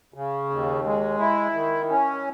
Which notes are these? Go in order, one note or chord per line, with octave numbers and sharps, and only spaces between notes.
C#3
D#2
G#3
E4
D#3
C#4